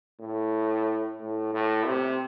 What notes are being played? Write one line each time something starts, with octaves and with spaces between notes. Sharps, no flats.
A2
A2
A2
C3